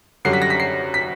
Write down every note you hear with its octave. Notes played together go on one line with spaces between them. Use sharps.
F#2 D3 G3 C7
B6
A#6
B6
C7
B6